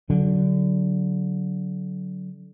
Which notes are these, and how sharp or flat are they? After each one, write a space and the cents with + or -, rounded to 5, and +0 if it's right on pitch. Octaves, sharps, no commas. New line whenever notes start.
D3 -25 F#3 +0